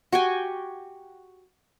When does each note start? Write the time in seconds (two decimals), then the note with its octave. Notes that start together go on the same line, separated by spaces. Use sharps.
0.12 F#4 G4 G5 G#5